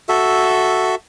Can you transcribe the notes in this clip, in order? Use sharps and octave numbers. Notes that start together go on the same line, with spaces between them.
F#4 A4 E5